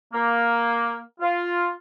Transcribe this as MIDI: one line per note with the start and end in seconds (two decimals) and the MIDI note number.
0.13 1.00 58
1.21 1.69 65